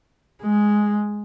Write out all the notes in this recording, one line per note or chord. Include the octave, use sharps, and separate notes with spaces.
G#3